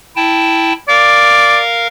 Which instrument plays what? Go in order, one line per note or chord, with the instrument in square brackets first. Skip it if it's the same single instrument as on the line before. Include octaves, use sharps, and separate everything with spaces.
[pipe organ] E4 G5 A5
[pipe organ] A#4 F5 [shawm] D5